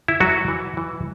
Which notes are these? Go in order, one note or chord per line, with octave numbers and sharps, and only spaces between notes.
E4
E3 F#3 F#4
E3
E3